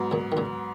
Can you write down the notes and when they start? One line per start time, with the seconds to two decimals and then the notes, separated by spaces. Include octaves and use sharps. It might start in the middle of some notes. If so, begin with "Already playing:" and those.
Already playing: G#2 F#3 B3
0.11 A#2 C#3
0.32 D#3
0.37 A#2 C#3